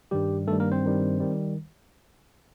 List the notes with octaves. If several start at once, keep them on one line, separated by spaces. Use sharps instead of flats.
G2 D#3 G3 G4
G2 D#3 G3 A3 A4
A#3 A#4
C4 C5
G2 D#3 G3
D#3 G3